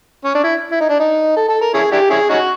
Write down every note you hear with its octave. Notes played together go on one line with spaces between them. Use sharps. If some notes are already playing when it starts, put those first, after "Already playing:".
C#4
D4
E4
E4
D#4
D4
D#4
A4
A4
A#4
C#4 E4 G#4
D4 E4 G4
C#4 E4 G#4
C#4 D#4 F#4